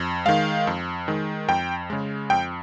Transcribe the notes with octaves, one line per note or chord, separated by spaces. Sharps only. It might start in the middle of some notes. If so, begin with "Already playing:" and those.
Already playing: F2
D#3 G#3 F5
F2
D#3 G#3
F2 G5
C#3 G#3
F2 G5